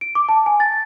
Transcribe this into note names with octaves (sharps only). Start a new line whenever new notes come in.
D7
D6
A5
G#5
A6